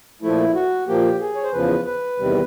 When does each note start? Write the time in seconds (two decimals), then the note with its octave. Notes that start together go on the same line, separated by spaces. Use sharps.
0.22 A#2 F3 A3 E4
0.54 F#4
0.87 A#2 F3 A#3 G4
1.20 G#4
1.35 C#5
1.43 C5
1.52 E2 C#3 F3 B4
1.85 B4
2.18 E2 C3 D#3 G3